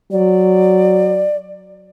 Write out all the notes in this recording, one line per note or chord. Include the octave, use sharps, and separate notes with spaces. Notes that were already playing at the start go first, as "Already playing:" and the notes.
F#3 D5